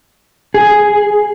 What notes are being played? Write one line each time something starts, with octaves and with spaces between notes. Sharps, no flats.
G#4